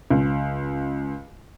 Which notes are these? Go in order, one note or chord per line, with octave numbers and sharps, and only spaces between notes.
C#2